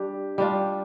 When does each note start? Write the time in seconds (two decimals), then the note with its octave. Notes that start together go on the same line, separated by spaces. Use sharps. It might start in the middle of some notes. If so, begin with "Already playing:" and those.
Already playing: G3 D4 G4
0.38 G3 D4 F4